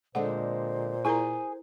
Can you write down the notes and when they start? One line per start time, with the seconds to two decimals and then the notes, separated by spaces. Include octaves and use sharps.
0.15 A#2 D3 G#3 C4 C5 F#5
1.05 E4 G#4 A#4 G#5 A#5